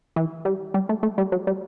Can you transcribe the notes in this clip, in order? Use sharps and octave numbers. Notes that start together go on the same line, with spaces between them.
E3
G3
G3
A3
A3
G3
F#3
G3